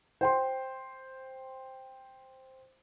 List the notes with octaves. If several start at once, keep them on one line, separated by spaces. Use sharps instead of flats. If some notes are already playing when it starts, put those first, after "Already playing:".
C5 G5 C6